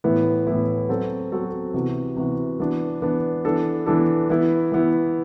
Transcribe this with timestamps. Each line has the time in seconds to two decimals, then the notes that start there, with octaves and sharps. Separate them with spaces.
0.04 A2 E3 B3 E4
0.47 A2 E3 B3 E4
0.89 F#3 C4 F#4 A4
1.32 F#3 C4 F#4 A4
1.74 C3 E3 B3 F#4
2.16 C3 E3 B3 F#4
2.60 E3 B3 D4
3.02 E3 B3 D4
3.45 E3 B3 D4 A4
3.86 E3 B3 D4 A4
4.30 E3 B3 E4
4.72 E3 B3 E4